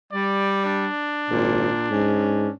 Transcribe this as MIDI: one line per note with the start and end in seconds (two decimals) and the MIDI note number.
0.12 0.88 55
0.12 0.60 74
0.65 2.53 62
1.30 1.68 32
1.30 1.88 46
1.91 2.47 44
1.91 2.51 61